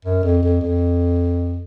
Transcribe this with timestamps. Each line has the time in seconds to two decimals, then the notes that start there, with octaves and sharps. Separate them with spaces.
0.05 F#2
0.24 F2
0.43 F2
0.61 F2